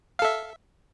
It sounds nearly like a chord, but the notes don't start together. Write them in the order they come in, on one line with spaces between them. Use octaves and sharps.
F5 A4 E5